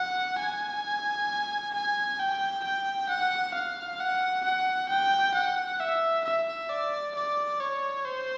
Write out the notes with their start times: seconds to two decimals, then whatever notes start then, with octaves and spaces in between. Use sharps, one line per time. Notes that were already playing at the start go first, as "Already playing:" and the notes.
Already playing: F#5
0.39 G#5
1.74 G#5
2.19 G5
2.64 G5
3.09 F#5
3.54 F5
3.99 F#5
4.44 F#5
4.89 G5
5.35 F#5
5.80 E5
6.25 E5
6.69 D5
7.15 D5
7.60 C#5
8.05 C5